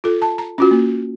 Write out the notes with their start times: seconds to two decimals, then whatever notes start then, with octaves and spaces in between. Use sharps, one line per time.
0.04 F4 A4
0.22 A5
0.38 A#5
0.58 C#4 F4 F#4
0.71 A#3